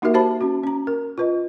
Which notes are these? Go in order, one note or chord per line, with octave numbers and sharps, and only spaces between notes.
A#3 D#4 F#4 G4 A#4 E5
F#4 G4 C5 E5 A5 B5
C#4 F#4
C#4 A#5
A#4
F4 B4 D#5